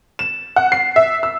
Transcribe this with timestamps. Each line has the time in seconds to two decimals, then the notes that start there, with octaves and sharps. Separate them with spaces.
0.19 E7
0.56 F#5
0.72 C7
0.96 E5
1.23 E6